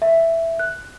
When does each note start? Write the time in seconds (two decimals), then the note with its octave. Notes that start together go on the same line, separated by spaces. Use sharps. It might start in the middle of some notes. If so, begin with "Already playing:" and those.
0.02 E5
0.59 F#6